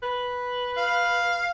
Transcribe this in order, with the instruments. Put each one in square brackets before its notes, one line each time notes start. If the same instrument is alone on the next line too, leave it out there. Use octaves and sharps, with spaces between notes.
[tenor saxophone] B4
[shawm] F5